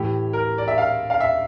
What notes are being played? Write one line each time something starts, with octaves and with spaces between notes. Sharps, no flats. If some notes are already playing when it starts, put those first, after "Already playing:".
Already playing: A2 E3 G4
A#4
D5
E5
F5
F5
E5